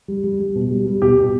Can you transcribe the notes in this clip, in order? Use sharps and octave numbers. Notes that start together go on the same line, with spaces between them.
G3
G3
G3
B2
G3
G3
B2 G4
B2